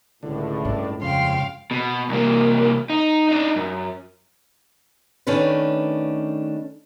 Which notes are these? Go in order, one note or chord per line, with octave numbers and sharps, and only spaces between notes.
C#2 A2 D3
G2 G#3 D4
F2 C#3 F5 G5 C6
B2
C2 A#3
D#4
D4 D#4
F#2
D#3 A3 C#4 D4 B4